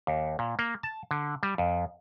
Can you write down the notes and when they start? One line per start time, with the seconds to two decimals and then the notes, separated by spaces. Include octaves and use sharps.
0.07 D#2
0.39 A#2
0.59 A#3
0.83 A5
1.11 D3
1.43 G3
1.58 F2